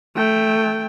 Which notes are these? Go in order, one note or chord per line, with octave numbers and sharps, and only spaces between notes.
A3 G5